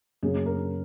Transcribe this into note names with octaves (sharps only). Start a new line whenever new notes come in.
F#2 C#3 F#3 A#3 G#4
A#4